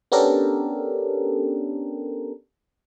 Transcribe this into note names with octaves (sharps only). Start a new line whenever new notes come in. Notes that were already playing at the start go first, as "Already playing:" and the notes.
B3 C#4 D4 G4 A4 A#4